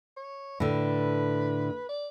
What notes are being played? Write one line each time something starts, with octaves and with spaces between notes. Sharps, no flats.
C#5
A2 D3 B4
D5